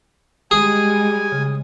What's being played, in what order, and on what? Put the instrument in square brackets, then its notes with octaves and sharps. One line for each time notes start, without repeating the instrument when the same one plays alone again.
[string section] G3 G#3 [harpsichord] G#4 [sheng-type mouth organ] G#5
[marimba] C#3